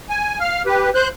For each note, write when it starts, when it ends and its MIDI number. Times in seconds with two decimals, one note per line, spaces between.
0.10 0.39 80
0.40 0.62 77
0.40 0.62 89
0.66 0.90 67
0.66 0.90 71
0.95 1.08 72
0.95 1.08 90
0.95 1.08 91